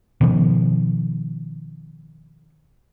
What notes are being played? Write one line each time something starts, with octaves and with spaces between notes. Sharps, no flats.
B2 D#3 F3